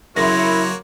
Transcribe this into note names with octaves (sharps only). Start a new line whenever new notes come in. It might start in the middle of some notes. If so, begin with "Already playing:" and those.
F#2 C#3 A#3 E4 F#4 C#5 C6 A#6